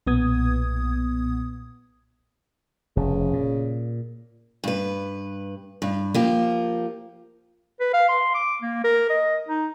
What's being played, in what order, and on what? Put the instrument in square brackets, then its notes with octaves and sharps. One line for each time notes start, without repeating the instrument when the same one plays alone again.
[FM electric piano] B1 A#2 B3 D#6 G#6
[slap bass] F1 [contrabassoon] C#3
[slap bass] A#2
[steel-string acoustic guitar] G2 B4
G2
F3 A#3 G4
[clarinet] B4
F5
C6
D6
A#3
A#4
D#5
D#4